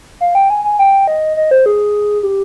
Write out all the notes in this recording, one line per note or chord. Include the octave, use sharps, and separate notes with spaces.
F5
G5
G#5
G#5
G5
D#5
D#5
C5
G#4
G4